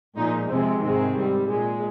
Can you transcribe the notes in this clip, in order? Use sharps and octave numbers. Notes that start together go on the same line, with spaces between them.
A#2 F3 G#3 D#4
F2 C3 F3 G#3 C4
G#2 D#3 G#3 C4
G#2 G3
A#2 G#3